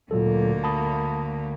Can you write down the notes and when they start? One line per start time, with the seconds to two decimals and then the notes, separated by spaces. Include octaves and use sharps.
0.11 D2 A#2 F#3 A#3 A4
0.64 A5 B5 D#6